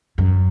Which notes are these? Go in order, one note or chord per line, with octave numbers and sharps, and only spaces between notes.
F#2